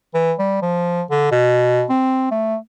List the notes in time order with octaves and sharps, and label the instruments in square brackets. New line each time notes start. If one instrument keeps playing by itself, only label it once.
[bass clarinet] E3
G3
F3
D3
B2
C4
A3